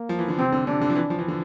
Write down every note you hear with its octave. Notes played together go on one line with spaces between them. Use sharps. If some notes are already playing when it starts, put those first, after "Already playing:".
Already playing: A#3
F3
E3
D3
C3 C4
D3
C3 D4
D3
F3
E3
F3
E3
D3